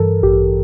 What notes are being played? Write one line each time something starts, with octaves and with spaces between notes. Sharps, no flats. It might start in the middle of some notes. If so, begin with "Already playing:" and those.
Already playing: G2 E3 A4 A#4
A1 G4